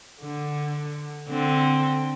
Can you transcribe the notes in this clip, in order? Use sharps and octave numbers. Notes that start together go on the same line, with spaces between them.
D3
D3 C4